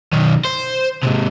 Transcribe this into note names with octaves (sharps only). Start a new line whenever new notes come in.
B1 D#3
C5
G#2 C3